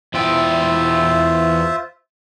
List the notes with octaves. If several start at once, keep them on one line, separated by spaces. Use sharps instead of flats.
E2 E4 F4 C5 E5 G5